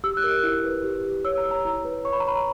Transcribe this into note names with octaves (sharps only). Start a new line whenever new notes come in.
G4 E6
F#6
A#4
F#6
E4
B4
G4
B4
C#5 E6
A#5
C#5
A#5
E4
B4
C#5 C#6
B5
A#5
C#5 B5